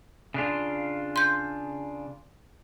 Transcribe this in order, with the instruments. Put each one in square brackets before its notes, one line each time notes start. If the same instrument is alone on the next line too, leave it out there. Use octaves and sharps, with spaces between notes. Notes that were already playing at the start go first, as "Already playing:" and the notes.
[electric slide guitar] C#3 D4 F4
[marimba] C6 G6